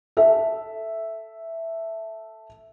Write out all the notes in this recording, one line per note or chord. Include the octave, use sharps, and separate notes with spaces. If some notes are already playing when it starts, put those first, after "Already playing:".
A4 E5